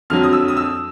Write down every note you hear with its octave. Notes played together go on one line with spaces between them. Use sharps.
F2 D3 F#3 F6
D#6
E6
D#6
E6